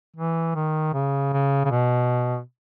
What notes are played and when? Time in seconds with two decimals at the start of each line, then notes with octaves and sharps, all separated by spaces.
0.17 E3
0.55 D#3
0.94 C#3
1.33 C#3
1.65 C#3
1.71 B2